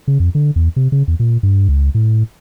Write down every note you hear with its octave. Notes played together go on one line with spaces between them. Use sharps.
C#3
F2
D3
E2
C3
C#3
E2
A#2
G2
C#2
A2